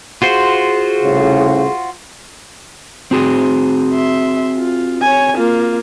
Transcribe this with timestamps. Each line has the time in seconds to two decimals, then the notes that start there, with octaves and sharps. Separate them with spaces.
0.22 F4 F#4 G#4 C5
1.03 C2 A2 C#3
3.11 C4 F#4 G#4
3.94 E5 C6
4.58 F4
5.02 C#5 G#5
5.37 A#3 F4